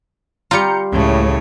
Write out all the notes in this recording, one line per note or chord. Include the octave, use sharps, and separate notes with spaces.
G3 F4 A#5 G6 C#7
C#2 A2 C#3 C#5